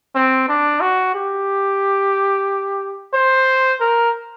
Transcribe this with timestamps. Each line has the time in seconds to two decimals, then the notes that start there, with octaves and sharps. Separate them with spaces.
0.15 C4
0.49 D4
0.81 F#4
1.14 G4
3.14 C5
3.80 A#4